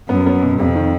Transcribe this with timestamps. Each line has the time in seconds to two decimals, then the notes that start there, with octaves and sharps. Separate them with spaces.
0.09 F#2 B3
0.26 B3
0.43 B2
0.59 F2 C3
0.75 D#3